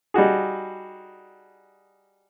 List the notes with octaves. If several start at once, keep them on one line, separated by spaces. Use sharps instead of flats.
G3 D#4 F#4 G#4